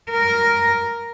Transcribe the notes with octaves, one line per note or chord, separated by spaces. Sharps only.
A#4